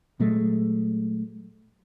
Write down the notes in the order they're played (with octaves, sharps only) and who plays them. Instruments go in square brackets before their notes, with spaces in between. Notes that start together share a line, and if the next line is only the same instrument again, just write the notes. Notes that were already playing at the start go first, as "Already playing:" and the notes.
[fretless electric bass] A#2 F#3 G#3 A3